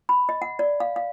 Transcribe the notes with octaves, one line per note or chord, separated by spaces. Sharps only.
B5
D#5
F#5
D5
F5
F5